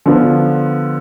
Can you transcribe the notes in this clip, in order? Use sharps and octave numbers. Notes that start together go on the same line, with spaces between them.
D3 F3 B3 F4